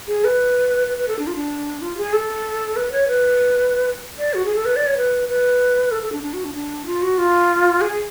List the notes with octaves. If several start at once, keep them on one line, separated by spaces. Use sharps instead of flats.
G#4
B4
B4
B4
A4
D4
F4
D4
F4
G#4
A4
B4
C#5
B4
D5
F#4
G#4
A4
B4
D5
C#5
B4
B4
A4
A4
D4
D4
F#4
D4
D4
F4
F#4
F4
G#4